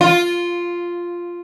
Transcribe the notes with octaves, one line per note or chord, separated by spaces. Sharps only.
F4